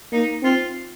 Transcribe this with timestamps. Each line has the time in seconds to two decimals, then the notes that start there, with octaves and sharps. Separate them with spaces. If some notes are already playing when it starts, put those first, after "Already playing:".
0.12 A#3 D#4
0.43 C4 F4